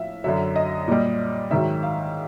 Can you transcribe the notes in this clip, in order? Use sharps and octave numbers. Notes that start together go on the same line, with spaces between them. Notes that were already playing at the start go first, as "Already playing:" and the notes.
Already playing: A2 F3 E5 F5
F#2 D3 F#3 E5
D#5
A#2 G3
G#2 D#3 F#3 E5
F5